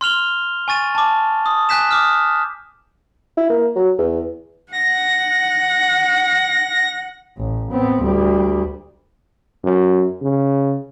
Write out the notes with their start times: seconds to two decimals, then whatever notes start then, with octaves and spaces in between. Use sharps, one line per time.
0.01 C6 F6 F7 G7
0.68 G#5 C#6 A6 D#7
0.95 A5 D6
1.46 D#6
1.69 G#5 F#6 G6 B6 E7
1.91 D6 D#6 F6
3.37 E4
3.50 A#3
3.76 F#3
3.98 E2
4.72 F#5 A#6
7.38 A1
7.71 B3 C4
8.02 D2 G3
9.63 F#2
10.22 C#3